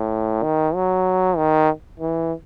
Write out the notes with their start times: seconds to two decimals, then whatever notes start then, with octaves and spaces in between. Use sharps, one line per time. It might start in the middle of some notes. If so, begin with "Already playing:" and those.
Already playing: A2
0.43 D#3
0.75 F#3
1.37 D#3
2.00 E3